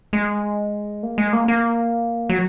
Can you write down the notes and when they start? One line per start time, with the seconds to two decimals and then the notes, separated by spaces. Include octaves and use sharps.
0.13 G#3
1.03 A#3
1.18 G#3
1.33 A#3
1.48 A#3
2.29 F#3